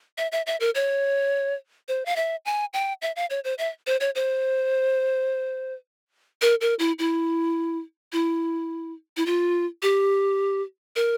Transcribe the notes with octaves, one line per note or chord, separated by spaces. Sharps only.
E5
E5
E5
A#4
C#5
C5
F5
E5
G#5
G5
E5
F5
C#5
C5
E5
C5
C#5
C5
A#4
A#4
E4
E4
E4
E4
F4
G4
A#4